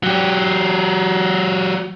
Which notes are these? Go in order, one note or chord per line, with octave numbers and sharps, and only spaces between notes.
F#3 G4